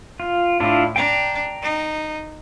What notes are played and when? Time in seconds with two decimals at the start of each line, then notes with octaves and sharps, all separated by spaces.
0.20 F4
0.60 A2 D4 E4 F4
0.96 D4 G5 A#5
1.62 D#4